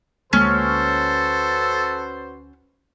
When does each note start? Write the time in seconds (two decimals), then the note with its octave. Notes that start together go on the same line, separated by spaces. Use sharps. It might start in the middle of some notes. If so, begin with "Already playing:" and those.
0.33 D2 G#3 A#3 C#4 F#4 A4 B4 C5